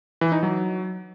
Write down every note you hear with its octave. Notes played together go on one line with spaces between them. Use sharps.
E3
D#4
F#3